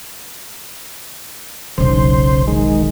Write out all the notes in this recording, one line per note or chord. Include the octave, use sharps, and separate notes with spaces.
E1 B1 C#3 C5
D#3 G#3